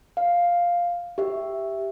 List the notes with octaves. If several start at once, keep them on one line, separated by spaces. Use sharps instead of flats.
F5
G4 E5